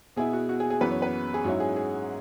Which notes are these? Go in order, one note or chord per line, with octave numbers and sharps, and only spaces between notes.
B2 B3 E4 G#4
F#4
F#4
G#4
G#4
F#2 E3 B3 B4
C#5
B4
G#4
G#2 F#3 C#4 E4 F#4
G#4
G#4